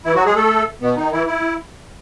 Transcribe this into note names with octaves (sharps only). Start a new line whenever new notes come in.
E3 E4
F#3 F#4
G#3 G#4
A3 A4
B2 B3
D#3 D#4
E3 E4
E4